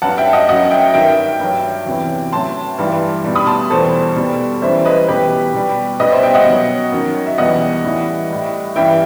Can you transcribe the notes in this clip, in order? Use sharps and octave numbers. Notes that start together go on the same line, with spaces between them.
G2 F#3 F#5 A5
E5 G5
D#5 F#5
F#2 F#3 D#5 F#5
E5 G5
G2 D#3 F#3 E5 G5
G2 F#3
E2 C3 F#3
A2 F#3 A5 C6
G2 E3 G3
B2 G3
B5 D#6
A5 C6
E2 B2 G3 A4 C5
B2 G3
F#2 E3 G3 C5 E5
B4 D#5
E2 B2 F#3 G4 B4
B2 G3
B2 G3 B4 D#5
C5 E5
E5 G5
D#5 F#5
B2 F#3
F#2 D#3 F#3
E5
E2 B2 G3 D#5 F#5
A2 E3 G3
A2 G3
G2 E3 G3 E5 G5